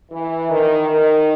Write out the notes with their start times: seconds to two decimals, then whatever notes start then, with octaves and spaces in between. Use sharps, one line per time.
0.11 E3
0.49 D#3
0.89 D#3